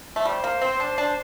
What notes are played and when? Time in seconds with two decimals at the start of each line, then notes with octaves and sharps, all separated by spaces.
0.16 A3
0.25 G3 C5
0.44 A#3
0.62 C4
0.80 D4
0.98 D4